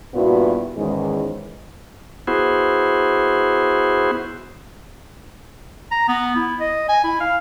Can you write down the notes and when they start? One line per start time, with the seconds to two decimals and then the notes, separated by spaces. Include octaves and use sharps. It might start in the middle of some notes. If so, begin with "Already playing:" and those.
0.14 G2 A#2 B3 E4 F#4
0.76 E2 G#2 D#3 E3 G#3 C#4
2.27 B3 E4 F#4 G#4 C5
5.91 A#5
6.08 B3
6.36 E4
6.60 D#5
6.89 G#5
7.04 E4
7.20 F5